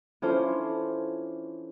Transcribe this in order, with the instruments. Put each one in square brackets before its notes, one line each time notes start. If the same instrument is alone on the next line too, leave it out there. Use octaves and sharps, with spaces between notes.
[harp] E3 C#4 D4 F4 A4 C5